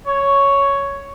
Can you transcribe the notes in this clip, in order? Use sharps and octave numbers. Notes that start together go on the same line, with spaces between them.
C#5